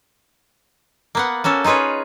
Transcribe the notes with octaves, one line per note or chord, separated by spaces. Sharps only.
A#3 B3 F#5
A#3 C#4 F#4 A4
D#4 F4 G#4 B4 C#5